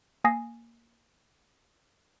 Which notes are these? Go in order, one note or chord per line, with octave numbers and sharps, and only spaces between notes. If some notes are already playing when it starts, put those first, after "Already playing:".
A#3 G#5 D#6 A#6 C7